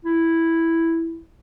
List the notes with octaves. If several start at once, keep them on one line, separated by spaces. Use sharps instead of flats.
E4